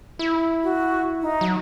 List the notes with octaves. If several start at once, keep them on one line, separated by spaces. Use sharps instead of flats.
E4
F#4
D#4
F#3